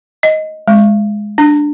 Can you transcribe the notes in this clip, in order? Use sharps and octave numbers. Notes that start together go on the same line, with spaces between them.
D#5
G#3
D4